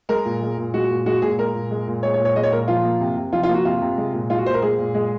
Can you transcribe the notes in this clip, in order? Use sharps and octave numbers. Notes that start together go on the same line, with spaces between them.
G#3 A#4
A#2
G#3
A#2
G#3 F#4
A#2
G#3 F#4
A#2 G#4
G#3 A#4
A#2
G#3
A#2
G#3 C#5
C#5
A#2
C#5
G#3 D#5
C#5
A#2 A#4
F3 F4
A#3
C3
C3
F3 F4
F4
A#3
F#4
C3 F4
C3
G#3
A#2
G#3 F4
F#4
A#2 C5
A#4
G#3 G#4
A#2
G#3